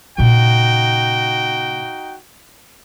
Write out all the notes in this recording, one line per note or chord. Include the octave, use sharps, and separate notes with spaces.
A#2 C#3 D#4 F#4 G5